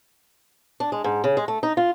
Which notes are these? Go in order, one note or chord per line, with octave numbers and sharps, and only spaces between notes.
D4
G#3
G#2
C#3
G#3
A3
D#4
F4